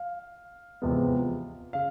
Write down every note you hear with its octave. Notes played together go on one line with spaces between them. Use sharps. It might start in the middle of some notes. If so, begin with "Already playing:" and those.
Already playing: F5
E2 C3 F3 G#3 B3
C#3 F5